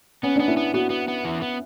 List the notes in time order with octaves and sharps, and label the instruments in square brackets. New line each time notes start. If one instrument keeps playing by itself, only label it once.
[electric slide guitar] B3 [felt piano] C#4
[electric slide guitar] B3 [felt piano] D4
[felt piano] E4
[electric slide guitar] B3
[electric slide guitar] B3 [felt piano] F#4
[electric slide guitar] B3
B3
E3
B3